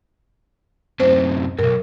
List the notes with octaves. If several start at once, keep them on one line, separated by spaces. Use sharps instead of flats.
F#2 C3 C5
B1 G2 A#4